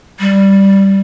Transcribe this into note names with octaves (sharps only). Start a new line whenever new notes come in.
G3